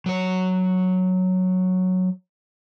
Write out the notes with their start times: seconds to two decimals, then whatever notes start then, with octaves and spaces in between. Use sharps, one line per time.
0.06 F#3 C#5